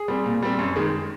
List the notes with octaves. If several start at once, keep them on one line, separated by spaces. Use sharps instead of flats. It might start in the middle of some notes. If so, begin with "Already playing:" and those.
Already playing: G#4
G3 C4
A#2
G3 C4
F#2
D#3 G#3